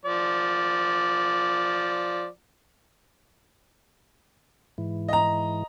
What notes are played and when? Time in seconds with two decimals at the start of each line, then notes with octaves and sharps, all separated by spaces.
0.05 F3 D5
4.78 G#2 E3
5.08 D#5 A#5